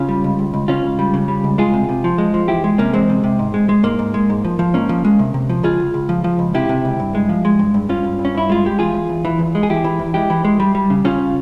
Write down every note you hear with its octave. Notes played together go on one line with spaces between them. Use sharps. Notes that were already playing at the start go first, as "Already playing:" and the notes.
Already playing: C#3 C#4 F4
G3
C#2
C#2
C#2
C#2 C#4 F4
C#2
G3
C#3
G3
C#2
G#3 F4 G#4
C3
C3
F3
G#3
F3
E2 E4 G4
G#3
C3 A#3 C#4
E2 G#3 C4
C3
C3
G#2
G#3
G#3
G#2 A#3
G#2
G#3
G#2
F3
F3
G#2 A#3 C#4
F3
G#3
C3
C3
F3
C#2 F4 G#4
C#2
C#2
F3
F3
C#2
C3 E4 G4
C3
C#2
G2
G#3
F3
G#3
G2
G2
G2 C#4 F4
G2
G2
C#4
G2 E4
G#3 F4
G#3 G4
E2 F4 G#4
E2
E2
E3
E2
G#3
G#4
E2 E4 G4
E3
E2
G#3 E4 G4
E3
G#3
G3
G3
C#3
C#3 C#4 F4